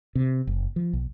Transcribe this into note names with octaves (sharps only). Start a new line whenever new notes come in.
C3
F#1
F3
B1